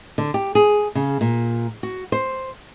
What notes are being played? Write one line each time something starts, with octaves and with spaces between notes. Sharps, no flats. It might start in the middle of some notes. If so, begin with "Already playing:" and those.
D3
G4
G#4
C#3
A#2
F#4
C5